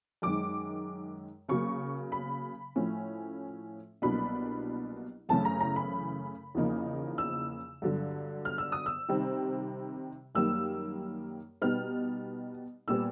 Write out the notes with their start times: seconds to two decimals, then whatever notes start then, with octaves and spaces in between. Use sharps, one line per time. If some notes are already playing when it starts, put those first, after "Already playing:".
0.22 F#2 D#3 G#3 D6
1.49 C#3 F#3 A#3 C#6
2.12 B5
2.75 A2 F3 A3 C#4
4.02 C2 B2 F#3 A#3 D4 B5
5.29 F#2 C#3 E3 A3 C#4 A5
5.45 A#5
5.60 A#5
5.76 B5
6.55 E2 C#3 F3 A#3 D#4
7.18 E6
7.82 G2 D3 F#3
8.45 F6
8.58 E6
8.72 D#6
8.86 E6
9.09 C3 D#3 G3 C4
10.35 F#2 D#3 G3 A#3 E6
11.62 B2 G3 B3 D#4 F6
12.88 A#2 G3 B3 E6